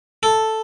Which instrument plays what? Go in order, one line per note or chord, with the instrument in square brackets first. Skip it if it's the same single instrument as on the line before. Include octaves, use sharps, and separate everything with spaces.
[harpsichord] A4